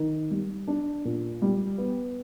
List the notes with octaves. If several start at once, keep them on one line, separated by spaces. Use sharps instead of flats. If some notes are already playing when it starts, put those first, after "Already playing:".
Already playing: D#3
G3
D4
A#2
G3
B3